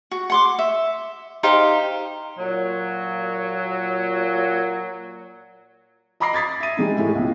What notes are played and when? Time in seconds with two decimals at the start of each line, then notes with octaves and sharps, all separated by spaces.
0.11 F#4
0.30 F#5 C6 D6
0.59 E5
1.43 D#4 G4 C5 F5
2.37 A#2 F#3
6.20 D#5 A#5 B5 D6 A#6 C7
6.33 D#6 G#6 A6 B6 C7
6.60 E5 D#7
6.77 G3 G#3 D#4
6.97 A2 G#3 E4 G4
7.15 C#2 B2